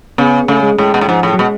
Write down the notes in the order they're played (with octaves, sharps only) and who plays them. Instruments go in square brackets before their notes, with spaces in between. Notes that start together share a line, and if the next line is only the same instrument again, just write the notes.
[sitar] C#3 [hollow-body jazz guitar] B3
[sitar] C#3 [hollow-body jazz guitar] A3
[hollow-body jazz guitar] G#3
[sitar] A2 [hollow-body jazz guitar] G#3
[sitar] B2
A2
[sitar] G#2 [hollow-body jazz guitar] F3
[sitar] A2
[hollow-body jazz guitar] F#3
[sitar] B2 [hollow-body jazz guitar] G#3